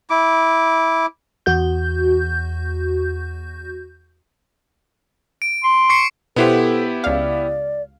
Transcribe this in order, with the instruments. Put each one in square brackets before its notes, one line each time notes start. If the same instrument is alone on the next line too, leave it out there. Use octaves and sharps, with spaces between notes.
[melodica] E4 D6
[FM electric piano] E2 F#4 G6
[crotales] D7
[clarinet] C6
[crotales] C#6 C7 C#7
[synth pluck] B2 C5 F#5 [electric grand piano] B3 E4 G4 [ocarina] A4
[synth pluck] C#2 F5 [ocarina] D5